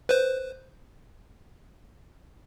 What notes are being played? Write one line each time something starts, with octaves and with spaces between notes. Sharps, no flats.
B4 C5